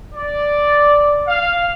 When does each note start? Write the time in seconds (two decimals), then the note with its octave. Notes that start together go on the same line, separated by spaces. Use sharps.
0.15 D5
1.28 F5